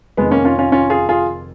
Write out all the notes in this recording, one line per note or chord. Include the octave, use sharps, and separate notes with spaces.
F1 F2 D#3 G#3 B3
A#3 C#4
C#4 F4
C#4 F4
C#4 F4
F4 G#4
F4 G#4